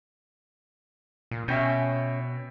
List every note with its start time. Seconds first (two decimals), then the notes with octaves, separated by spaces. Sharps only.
1.31 A#2
1.48 B2 C#4 E5 G5 G6